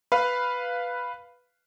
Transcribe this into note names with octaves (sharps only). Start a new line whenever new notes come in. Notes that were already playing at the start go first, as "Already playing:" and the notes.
B4 F5